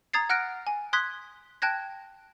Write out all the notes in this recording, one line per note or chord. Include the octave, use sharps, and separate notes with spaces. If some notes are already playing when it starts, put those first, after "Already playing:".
A#5 D#6 G#6 A6 C7
F#5 F6 F#6 A#6 D7
G#5
C6 D#6 F#6 G#6 B6
G5 A5 F#6 G#6 A#6